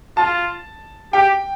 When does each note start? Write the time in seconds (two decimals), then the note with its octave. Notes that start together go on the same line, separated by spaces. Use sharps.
0.17 F4 A5
1.13 G4 G5